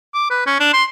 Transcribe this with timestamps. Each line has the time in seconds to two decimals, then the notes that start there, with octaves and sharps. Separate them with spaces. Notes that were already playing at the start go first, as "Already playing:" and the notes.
0.14 D6
0.30 B4
0.46 C#4
0.60 D4
0.73 C6